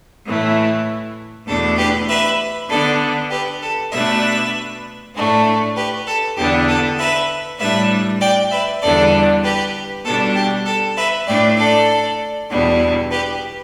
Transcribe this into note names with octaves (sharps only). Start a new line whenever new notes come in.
A2 E3 A3
E2 B2 A3 D4 A4
G4 B4
B4 E5
D3 B3 D4 A4 D5
G4 B4
A4
B2 A3 D4 B4 E5
A2 A3 D4
G4 B4
A4
E2 D3 B3 D4 G4
A4
B4 E5
A2 G3 D4 B4 E5
D5 G5
B4 E5
E2 D3 G3 D4 A4 D5
G4 B4
B2 G3 D4 A4
G4
A4
B4 E5
A2 A3 D4 D5 G5
A4 D5
E2 B2 G3 D4
G4 B4